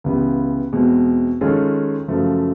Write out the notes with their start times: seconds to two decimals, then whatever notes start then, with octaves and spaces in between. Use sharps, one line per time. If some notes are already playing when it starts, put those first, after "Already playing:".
0.04 C#2 C#3 E3 G3 B3
0.73 E2 B2 G#3 C4
1.41 D#3 G#3 C#4 F4 A4
2.08 F#2 C#3 F3 A3